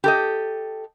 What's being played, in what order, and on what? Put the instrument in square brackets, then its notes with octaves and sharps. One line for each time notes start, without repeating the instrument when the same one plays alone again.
[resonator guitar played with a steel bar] G4 A4 D#5